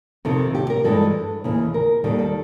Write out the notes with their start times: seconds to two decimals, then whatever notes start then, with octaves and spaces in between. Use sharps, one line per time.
0.25 F2 C3 D#3 A4
0.55 G4
0.70 A#4
0.84 G2 E3 G#3 A4
1.44 D#2 C#3 E3
1.74 A#4
2.04 D#2 D#3 G3 A4
2.19 A4